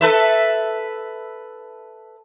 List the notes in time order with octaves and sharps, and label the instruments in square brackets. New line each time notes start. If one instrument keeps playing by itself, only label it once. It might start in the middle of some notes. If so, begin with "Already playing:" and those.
[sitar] A4 B4 E5